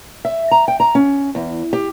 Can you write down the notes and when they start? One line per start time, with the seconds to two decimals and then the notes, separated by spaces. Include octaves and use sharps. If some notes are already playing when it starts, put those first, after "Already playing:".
0.25 E5
0.51 A#5
0.68 G5
0.80 A#5
0.95 C#4
1.35 E2
1.73 G4